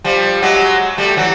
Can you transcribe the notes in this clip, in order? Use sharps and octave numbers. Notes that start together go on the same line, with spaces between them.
F3 G3
F#3 G#3
G3 A3
E3 F#3